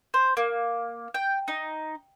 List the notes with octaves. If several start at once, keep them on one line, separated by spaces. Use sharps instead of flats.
C5
A#3
G5
D#4